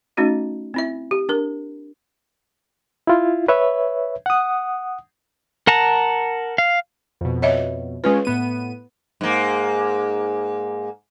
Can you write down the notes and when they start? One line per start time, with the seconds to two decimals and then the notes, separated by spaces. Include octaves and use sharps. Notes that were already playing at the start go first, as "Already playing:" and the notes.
0.17 A3 C#4 D#4 F#4 D#5
0.74 C4 E4 E5
1.11 G4
1.29 D4 A#4
3.07 E4 F4
3.48 B4 C#5 E5
4.26 F#5 D#6
5.67 A#4 F#5 A5 A#5
6.58 F5
7.21 F2 B2
7.42 C#5 D#5 E5
8.04 G#3 C#4 F4 B4
8.25 A2 B3 D#7
9.21 G#2 A#3